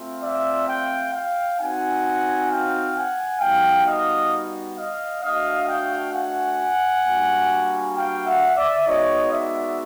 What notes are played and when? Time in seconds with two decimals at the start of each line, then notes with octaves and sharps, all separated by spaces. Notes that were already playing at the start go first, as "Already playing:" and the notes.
Already playing: A3 C4 F4
0.23 D5 E5
0.68 F5 G5
1.14 F5 G5
1.59 C4 D#4 F#4 F#5 G#5
2.50 F5 G5
2.96 F#5 G#5
3.41 G3 B3 D#4 F#4 F5 G5
3.86 D#5 F5
4.77 D#5 F5
5.23 A3 D4 F#4 D#5 F5
5.68 F5 G5
6.14 F#5 G#5
7.05 G3 A#3 D4 F#4
7.95 F5 G5
8.26 E5 F#5
8.56 D5 E5
8.87 G#3 B3 D#4 F#4 C#5 D#5
9.31 D5 E5